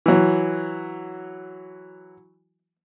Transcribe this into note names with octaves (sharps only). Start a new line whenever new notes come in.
E3 F#3